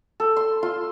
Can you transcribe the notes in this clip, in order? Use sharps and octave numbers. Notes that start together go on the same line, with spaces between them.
A4
C6
F4 C6